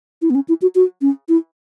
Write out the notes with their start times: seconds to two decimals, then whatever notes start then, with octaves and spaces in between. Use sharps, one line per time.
0.22 E4
0.30 B3
0.35 C#4
0.49 E4
0.62 F#4
0.75 F#4
1.01 C#4
1.29 E4